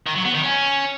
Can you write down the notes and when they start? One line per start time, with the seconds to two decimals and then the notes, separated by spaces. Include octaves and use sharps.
0.07 D#3
0.16 F#3
0.25 B3
0.34 D#3
0.43 C#4